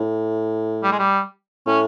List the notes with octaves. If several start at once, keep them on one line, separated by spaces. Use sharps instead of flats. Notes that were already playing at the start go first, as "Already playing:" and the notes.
Already playing: A2
G3
G#3
G3
A2 C#4